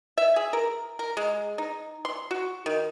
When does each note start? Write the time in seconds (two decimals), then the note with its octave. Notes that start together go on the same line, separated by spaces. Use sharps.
0.18 E5
0.36 G#4
0.53 A#4
0.99 A#4
1.17 G#3
1.58 D#4
2.05 C6
2.31 F#4
2.66 D#3